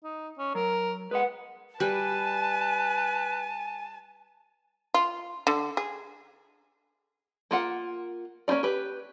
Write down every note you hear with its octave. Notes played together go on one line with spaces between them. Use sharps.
D#4
C#4
F#3 A#4
G#3 B4 F#5
G3 B4 G#5 A5
F4
D3
G#4
A#3 F4 F#5
A#3 C#4 D#4 F4 D5
G4 B4